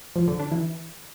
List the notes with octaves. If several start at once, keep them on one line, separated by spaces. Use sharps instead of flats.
F3
D3
D4
E3